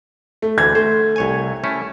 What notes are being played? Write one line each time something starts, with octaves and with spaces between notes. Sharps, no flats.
A3
D2 D3 E3 G#6
A3 C5
C2 C#5 G#5
A3 C#4 E4